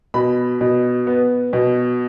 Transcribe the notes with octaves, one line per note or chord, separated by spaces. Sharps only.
B2 B5
B2
B3
B2